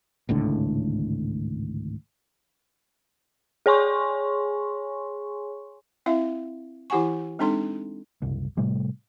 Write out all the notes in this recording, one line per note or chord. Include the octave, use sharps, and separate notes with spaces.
G#1 C#2 A2 D3
G#4 C#5 G#5 C6 C#6
C4 E4 E5 F5
E3 E4 G4 F#5 G#5 C#6
G#3 C4 D4 D#4 A4 C6
F#1 C2
A2 C3 G3 A3